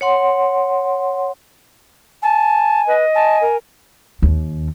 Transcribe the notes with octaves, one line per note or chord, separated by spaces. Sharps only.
C#5 F#5 C6
G#5 A5
B4 D#5
G#5 A5
A#4
D#2